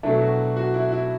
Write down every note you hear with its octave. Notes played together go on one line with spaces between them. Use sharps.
B2 F#3 A3 D4 E4
F#4
F#4
E4
E4